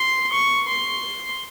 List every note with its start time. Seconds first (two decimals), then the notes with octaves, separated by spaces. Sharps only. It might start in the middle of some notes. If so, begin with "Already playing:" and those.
Already playing: C6
0.32 C#6
0.69 C6